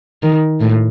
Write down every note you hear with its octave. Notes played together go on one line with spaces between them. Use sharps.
D#3
A2